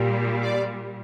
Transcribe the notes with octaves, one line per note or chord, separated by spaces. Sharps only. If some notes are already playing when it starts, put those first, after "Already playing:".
Already playing: A#2 G3
D5